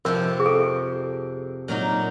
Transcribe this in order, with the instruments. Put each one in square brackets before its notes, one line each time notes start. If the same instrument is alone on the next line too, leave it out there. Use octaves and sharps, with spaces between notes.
[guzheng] F2 C3 F3 [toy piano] A#4
[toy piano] G#4
A4
[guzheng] A#2 F#3 A#3 D#4